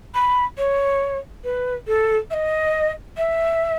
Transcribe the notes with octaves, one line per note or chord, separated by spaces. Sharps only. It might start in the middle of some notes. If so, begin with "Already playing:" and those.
B5
C#5
B4
A4
E5
D#5
E5